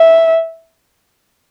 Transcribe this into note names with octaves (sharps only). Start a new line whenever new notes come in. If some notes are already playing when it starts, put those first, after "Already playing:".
Already playing: E5